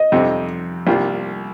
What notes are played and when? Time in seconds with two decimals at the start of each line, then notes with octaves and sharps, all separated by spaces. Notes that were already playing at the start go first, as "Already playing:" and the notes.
Already playing: D#5
0.12 F2 C3 G3 C4
0.87 C2 C3 G3 A#3 F4